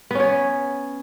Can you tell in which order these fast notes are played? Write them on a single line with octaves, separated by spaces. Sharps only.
B3 C#4 C#5